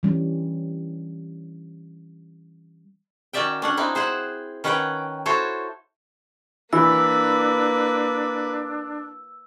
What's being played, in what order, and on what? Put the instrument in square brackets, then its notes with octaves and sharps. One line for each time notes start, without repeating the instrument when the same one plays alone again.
[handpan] E3 G3 C#4
[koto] D#3 C#4 F#4 D5 E5 G5
C#4 D4 F#5
C4 D#4 E4
G#4 C5 E5 F#5
D#3 C#4 B4 C#5 F#5 G5
E4 F#4 A4 C5 C#5
[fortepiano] E3 [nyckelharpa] A#3 B4 [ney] D4 [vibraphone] E6